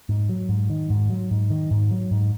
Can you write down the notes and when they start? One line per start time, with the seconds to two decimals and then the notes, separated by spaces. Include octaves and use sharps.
0.09 G#2
0.29 F#3
0.49 G#2
0.70 D#3
0.90 G#2
1.10 F#3
1.31 G#2
1.50 D#3
1.71 G#2
1.91 F#3
2.11 G#2